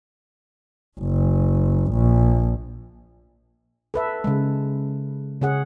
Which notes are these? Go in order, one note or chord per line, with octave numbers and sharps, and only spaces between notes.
F#1
A#1
A4 B4 E5
C#3 G#3
C#3 C#4 G#4 F#5